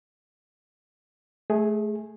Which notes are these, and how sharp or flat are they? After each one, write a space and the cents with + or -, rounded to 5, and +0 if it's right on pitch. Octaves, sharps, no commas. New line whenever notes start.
A3 -25 G#4 +0